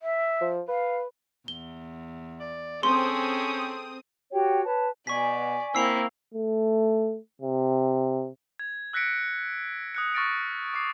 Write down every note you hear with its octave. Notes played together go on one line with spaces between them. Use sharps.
E5
F3
B4 F5
E2 G7
D5
C4 C#4 G#4 A4 C6 D#6
F#4 G4 C#5 G5
B4 C#5 A5
B2 D5 G#5 C#6 B6
A#3 C4 E4 E6 C7 F7
A3
C3
G#6
E6 F#6 A#6 B6 C#7 D7
D#6 F#6 C#7
C#6 F6 A6 A#6 C#7 D7
D6 D#6 C7